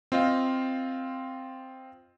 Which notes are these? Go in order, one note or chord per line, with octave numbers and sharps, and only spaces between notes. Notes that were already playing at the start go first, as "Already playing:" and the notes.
C4 F4 D#5 F5